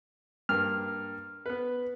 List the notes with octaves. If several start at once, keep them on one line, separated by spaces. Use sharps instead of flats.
G2 A#3 F6
B3 B4